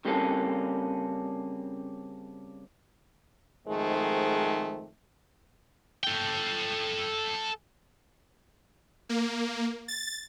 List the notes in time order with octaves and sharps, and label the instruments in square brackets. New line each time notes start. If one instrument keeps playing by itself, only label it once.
[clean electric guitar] C#3 G3 A#3 C4 C#4 A4
[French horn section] F2 G#2 D#3 G#3 A3
[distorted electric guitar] A4 G5
[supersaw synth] A#3
A6